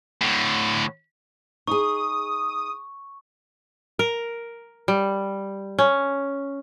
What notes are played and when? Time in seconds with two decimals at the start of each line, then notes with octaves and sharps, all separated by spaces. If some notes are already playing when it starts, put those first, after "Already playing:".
0.22 A2 D3
1.67 D#4 G#4 C#6 D#6
3.99 A#4
4.88 G3
5.79 C#4